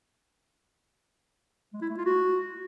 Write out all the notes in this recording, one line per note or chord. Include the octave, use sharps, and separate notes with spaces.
G#3
E4
A3
F4
F#4